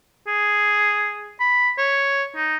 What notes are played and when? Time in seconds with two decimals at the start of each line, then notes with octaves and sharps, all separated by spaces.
0.28 G#4
1.40 B5
1.78 C#5
2.36 D#4